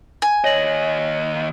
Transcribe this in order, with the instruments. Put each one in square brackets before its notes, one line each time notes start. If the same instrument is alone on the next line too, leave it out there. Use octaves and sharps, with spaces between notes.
[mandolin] G#5
[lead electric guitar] D#2 D#5 [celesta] C#5 A#6 F#7